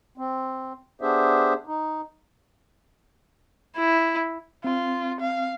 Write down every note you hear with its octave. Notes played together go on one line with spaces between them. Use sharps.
C4
B3 D4 G4 G#4 C5 E5
D#4
E4
C4 F4
F5